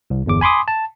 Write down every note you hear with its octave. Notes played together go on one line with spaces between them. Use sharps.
C2
G1 E2 D6
G#5 B5 C6 D6 D#6
A5